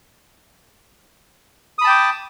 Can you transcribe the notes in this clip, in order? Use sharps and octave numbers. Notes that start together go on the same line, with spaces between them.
G5 A5 B5 D6 D#6